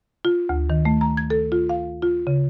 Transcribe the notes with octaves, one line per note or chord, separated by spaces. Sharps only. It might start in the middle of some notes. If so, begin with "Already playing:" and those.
F4
D2
D#3
A3
A#5
G#6
A4
F4
F5
F4
C#3